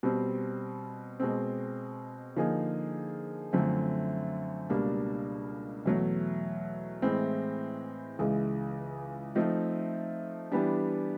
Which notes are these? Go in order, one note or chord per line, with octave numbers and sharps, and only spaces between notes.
B2 G3 C4
B2 G#3 C4
D3 F3 A#3 D#4 G#4
F#2 D3 F3 A3 C4
C#2 B2 G3 A#3 D4
E2 B2 F#3 A3
A2 E3 G#3 C4
C#2 C#3 E3 G#3
F3 A3 C4 D#4
E3 G3 B3 D4 G4